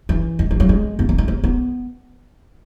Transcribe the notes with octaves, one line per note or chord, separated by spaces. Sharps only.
E3
G#3
E3
F#3
G#3
B3
A#3
G#3
A#3
B3